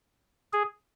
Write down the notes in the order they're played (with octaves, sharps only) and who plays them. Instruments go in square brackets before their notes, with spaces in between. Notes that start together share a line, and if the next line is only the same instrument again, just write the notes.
[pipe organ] G#4